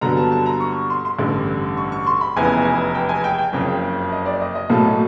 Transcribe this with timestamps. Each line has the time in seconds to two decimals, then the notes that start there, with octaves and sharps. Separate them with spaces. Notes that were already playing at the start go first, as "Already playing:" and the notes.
0.01 G2 D3 F#3 B3 A#5
0.17 A5
0.32 A5
0.46 A#5
0.60 C#6
0.90 C6
1.05 C6
1.18 A1 G2 D3
1.77 C#6
1.92 C#6
2.07 C6
2.21 B5
2.36 F1 E2 C#3 E3 G#5
2.65 G#5
2.95 G5
3.09 G#5
3.24 G5
3.38 G5
3.53 F#1 F2 C#3
4.12 D#5
4.26 D5
4.41 D#5
4.55 D#5
4.70 B1 A2 F#3 A#3 A4